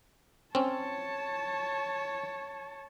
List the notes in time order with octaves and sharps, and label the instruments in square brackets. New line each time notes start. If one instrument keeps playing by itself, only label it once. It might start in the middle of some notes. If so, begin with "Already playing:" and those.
[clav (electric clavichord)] C4 C#4 [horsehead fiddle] C#5 A5